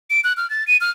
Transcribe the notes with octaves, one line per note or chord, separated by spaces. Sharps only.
D7
F#6
F6
A6
D#7
F6